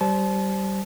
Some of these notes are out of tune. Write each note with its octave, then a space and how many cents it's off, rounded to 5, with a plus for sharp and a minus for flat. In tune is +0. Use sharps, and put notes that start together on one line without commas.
G3 -20 C5 +0 A5 -30